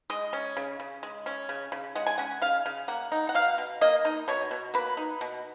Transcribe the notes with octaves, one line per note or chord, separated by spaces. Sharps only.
G#3 D#5
C#4
C#3
C#3
G#3
C#4
C#3
C#3
G#3 F#5
G#5
C#4 F#5
C#3 F5
C#3
A#3 F#5
D#4
F#5
B2 F5
B2
A#3 D#5
D#4
B2 C#5
B2
A#3 B4
D#4
B2